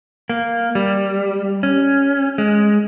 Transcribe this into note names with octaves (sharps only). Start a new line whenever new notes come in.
A#3
G3
C#4
G#3